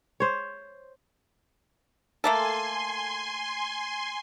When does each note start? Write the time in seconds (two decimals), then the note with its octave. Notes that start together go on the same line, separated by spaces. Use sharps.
0.20 C5 C#5
2.24 A3 A#3 A4 G#5 C6